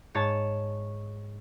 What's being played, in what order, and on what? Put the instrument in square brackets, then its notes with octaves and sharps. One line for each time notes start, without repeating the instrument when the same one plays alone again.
[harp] G#2 C#5 A5 A6